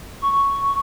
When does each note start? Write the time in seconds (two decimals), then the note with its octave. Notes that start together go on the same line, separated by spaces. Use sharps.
0.22 C#6